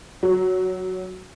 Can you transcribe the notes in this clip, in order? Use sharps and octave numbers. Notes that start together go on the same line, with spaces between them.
F#3